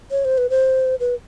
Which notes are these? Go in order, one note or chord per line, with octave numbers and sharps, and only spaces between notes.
C#5
C5
B4
C5
B4